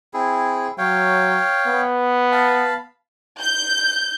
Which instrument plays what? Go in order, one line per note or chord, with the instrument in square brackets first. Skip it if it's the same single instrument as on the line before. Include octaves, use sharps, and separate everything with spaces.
[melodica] C4 E4 G#4
[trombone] F#3 [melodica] C#5 F5 G5
[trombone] B3
[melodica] F5 A5 B5
[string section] G6